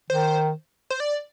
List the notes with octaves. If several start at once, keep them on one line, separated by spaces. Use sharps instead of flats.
D#3 C5
C5
D5